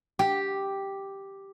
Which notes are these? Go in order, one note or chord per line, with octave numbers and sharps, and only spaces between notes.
G4